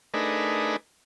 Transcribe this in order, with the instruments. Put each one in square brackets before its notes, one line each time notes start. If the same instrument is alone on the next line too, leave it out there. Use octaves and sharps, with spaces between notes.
[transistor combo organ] A3 D4 D#4 G#4 A#4 B4